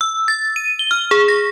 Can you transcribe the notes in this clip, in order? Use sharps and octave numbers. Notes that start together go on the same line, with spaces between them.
E6
A6
D#7
G7
F6
G#4
A#6